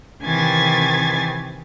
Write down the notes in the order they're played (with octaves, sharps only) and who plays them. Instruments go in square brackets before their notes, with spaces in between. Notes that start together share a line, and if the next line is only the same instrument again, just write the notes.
[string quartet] C3 D#3 E3 G#5 G#6 A6